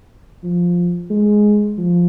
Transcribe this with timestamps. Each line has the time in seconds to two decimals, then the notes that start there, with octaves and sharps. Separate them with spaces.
0.44 F3
1.10 G#3
1.78 F3